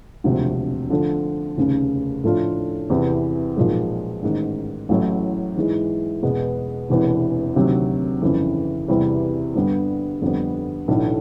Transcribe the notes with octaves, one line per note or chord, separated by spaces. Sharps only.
E1 D2 C3 F3
D3 F3 A3
F1 D#2 C#3
A2 F3 A3 D4 F4
E2 C3 E3
B1 A#2 F3 G#3
A1 G#2 D#3
A1 A2 F#3
G#2 E3 G#3
E2 B2 G#3 B3
E1 E2 C3 E3
D2 C3 D#3 F#3
G1 F2 C#3 E3
E2 C3 E3 G3
G2 D3 G3 B3
F2 D3 G3 B3
B1 A2 E3 A3 D4